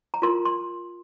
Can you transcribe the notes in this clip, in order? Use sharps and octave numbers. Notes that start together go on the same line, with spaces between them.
A#5
F4 A#4 C6
C6